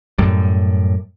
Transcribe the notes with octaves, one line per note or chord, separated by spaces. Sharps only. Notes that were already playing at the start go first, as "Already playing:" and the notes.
F#2 A2 G3